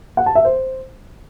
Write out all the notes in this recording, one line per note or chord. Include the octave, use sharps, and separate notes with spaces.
F#5
A5
E5
C5